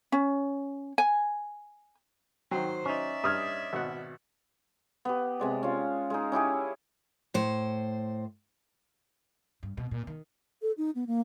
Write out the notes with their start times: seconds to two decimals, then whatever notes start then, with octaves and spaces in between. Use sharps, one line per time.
0.12 C#4
0.98 G#5
2.51 D#3 F#3 C5 G5
2.85 C#4 D#4 D5 E5
3.24 G2 D#6 F6 G#6
3.73 G#1 B2 F#5
5.05 B3 G4
5.40 C3 G#3 D5
5.63 C#4 F4
6.10 G#3 D#4
6.32 C#4 E4 G4 G#4
7.34 A2 C5
9.63 G2
9.77 B2
9.91 A#2
10.07 D#3
10.62 A4
10.78 D#4
10.95 B3
11.07 A#3